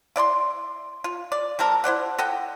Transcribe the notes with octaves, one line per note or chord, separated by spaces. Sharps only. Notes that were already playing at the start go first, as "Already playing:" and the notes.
E4 D5 B5 C6
F4
D5
G3 C4 A4 A#4
E4 C5 D5 F#5
A4 D#5 F#5 G5